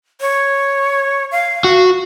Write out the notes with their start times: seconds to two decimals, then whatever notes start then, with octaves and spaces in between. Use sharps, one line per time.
0.21 C#5
1.31 F5
1.64 F#4